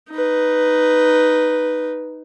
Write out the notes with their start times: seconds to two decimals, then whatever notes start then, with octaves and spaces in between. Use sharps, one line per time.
0.11 D#4 B4